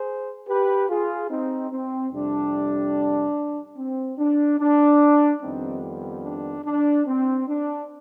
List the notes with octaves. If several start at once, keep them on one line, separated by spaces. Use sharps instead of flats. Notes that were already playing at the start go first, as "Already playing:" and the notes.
Already playing: G#4 C5
G4 B4
F4 G#4
C4 D#4
C4
F2 C3 G3 D4
C4
D4
D4
F2 D#3 G3 B3 C4 D#4
D4
D4
C4
D4